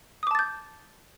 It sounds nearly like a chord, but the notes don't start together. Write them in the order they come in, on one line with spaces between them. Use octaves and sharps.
D#6 D6 A5 A6 G6